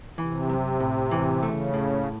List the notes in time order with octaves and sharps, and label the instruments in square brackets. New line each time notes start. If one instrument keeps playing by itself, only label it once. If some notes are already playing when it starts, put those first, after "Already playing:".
[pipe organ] C3 [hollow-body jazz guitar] E3
[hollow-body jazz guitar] F#2
A2
E3
[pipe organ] C#3 [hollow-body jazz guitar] A3
[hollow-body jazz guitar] A2